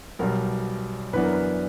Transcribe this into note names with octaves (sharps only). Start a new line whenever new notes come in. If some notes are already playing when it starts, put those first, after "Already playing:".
B1 B2 G3 A#4
F#2 E3 B3 D4 B4
A#4
B4